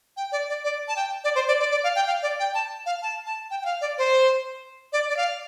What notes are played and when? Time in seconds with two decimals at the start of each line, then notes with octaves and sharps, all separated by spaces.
0.17 G5
0.32 D5
0.49 D5
0.64 D5
0.88 A5
0.96 G5
1.24 D5
1.35 C5
1.48 D5
1.60 D5
1.71 D5
1.84 F5
1.96 G5
2.07 F5
2.23 D5
2.40 G5
2.55 A5
2.86 F5
3.02 A5
3.26 A5
3.51 G5
3.62 G5
3.65 F5
3.81 D5
3.98 C5
4.93 D5
5.09 D5
5.17 F5